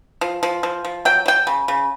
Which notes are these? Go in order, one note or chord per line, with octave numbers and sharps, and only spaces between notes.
F3
F3
F3
F3
F#3 G5
F#3 G5
C#3
C#3